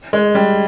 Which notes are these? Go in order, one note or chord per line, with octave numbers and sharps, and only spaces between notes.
G#3
G3